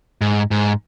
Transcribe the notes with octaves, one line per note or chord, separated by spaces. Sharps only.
G#2
G#2